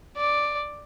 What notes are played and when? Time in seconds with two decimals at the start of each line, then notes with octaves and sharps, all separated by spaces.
0.17 D5